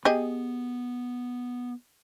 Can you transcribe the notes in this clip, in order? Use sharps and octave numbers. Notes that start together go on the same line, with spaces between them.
B3 G4 G#4 D#5